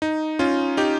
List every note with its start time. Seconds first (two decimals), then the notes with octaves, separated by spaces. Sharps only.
0.02 D#4
0.39 C#4 F4
0.77 D#4 G4